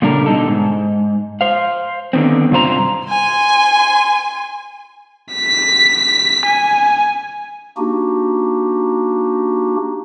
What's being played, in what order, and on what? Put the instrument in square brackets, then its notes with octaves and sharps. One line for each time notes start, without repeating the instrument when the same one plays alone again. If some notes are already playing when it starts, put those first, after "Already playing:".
[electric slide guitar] A#2 C#3 G3 D4 A4 A#4
B2 D3 D#4 A4
G#2
C5 F5
D3 D#3 B3 C4
G2 C3 F4 C5 A#5
[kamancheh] G#5 C6
[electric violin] B6
G#5
[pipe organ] A#3 D4 D#4 F#4 G4